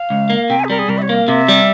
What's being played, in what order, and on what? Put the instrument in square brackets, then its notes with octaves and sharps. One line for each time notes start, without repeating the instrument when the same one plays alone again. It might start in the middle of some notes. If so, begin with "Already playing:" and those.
Already playing: [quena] F5
[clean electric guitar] C#2
A#3
[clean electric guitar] C3 [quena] G5
[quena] G#5
G#4
[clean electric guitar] G3 [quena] A#4
[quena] G#4
[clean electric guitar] C2 [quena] A#4
[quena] E5
C#5
[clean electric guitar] A#3
[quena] F5
[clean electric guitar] C3 [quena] E5
[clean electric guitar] G3